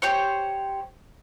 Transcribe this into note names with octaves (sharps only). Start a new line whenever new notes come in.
G4 C5 C#5